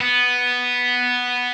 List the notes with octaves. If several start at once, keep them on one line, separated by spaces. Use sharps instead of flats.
B3